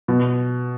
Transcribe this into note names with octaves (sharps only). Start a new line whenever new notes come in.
B2